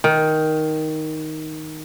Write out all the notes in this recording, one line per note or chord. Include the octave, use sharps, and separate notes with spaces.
D#3